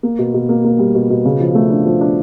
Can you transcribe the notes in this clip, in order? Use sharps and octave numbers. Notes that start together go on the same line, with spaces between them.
A#3
B2
B2
A#3
A#3
G3
B2
B2
C#3
F3
A3
D4
F3
D4